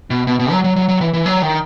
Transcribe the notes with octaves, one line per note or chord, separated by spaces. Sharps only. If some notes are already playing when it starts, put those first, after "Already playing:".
B2
B2
B2
F#3
F#3
F#3
F#3
E3
E3
F#3
D#3